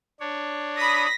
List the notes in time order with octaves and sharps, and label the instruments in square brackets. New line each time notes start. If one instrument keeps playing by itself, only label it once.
[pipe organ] D4 C#5
[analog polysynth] B5 D#6 [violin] A#6 B6